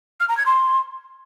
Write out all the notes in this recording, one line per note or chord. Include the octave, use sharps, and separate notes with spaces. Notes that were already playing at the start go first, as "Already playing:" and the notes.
F6
A#5
G#6
C6